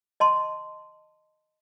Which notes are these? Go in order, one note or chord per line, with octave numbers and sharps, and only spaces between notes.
D#5 A5 C6